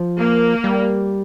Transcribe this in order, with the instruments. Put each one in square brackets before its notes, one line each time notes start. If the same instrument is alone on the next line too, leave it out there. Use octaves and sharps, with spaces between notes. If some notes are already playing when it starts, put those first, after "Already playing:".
Already playing: [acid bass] F3
[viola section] A#3
[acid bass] G3